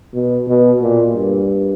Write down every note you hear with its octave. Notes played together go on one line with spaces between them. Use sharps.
B2
B2
A#2
G2